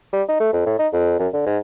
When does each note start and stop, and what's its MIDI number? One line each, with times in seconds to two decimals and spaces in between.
0.13 0.22 55
0.29 0.38 63
0.40 0.49 57
0.53 0.66 41
0.66 0.77 45
0.79 0.88 63
0.93 1.16 41
1.19 1.28 42
1.33 1.43 50
1.46 1.58 44